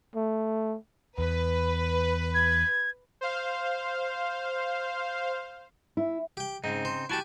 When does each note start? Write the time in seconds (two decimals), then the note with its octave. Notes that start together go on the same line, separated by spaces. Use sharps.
0.15 A3
1.18 E2 B4
2.35 G#6
3.21 C5 F5
5.97 E4
6.37 G4 G5
6.64 G#2 C#3 C4 D#4
6.85 C5
7.10 E4 F#4 G4 G#5 A5